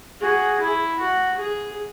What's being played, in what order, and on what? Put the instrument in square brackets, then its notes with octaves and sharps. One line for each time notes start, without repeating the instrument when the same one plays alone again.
[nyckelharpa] F#4 [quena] G#4
[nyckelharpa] E4
F#4
G#4